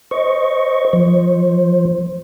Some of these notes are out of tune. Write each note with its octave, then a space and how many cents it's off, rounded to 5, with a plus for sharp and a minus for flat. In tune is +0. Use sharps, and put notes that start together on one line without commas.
C5 +0 D#5 +0 C#6 +0
F3 +0 C5 +20